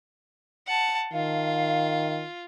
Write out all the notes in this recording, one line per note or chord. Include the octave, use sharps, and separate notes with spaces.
F#5 A5
D#3 F4 F5